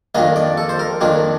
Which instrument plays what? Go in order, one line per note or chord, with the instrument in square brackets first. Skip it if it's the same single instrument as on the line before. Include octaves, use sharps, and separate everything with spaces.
[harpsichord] F2 D#3 A#3 D4 D#5
D5
A4
C5
A#4
F2 D#3 A#3 D4